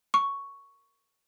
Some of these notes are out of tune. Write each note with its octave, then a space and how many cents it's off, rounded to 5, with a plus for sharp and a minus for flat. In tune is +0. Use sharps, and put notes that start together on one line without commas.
C#6 +5